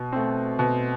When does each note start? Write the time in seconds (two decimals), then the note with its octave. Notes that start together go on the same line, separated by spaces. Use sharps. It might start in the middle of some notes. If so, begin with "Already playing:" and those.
Already playing: B2
0.12 A3 C4
0.59 B2